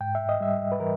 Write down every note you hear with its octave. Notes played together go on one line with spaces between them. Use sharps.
G#2 G5
E5
D#5
G3 E5
B4
E3 A#4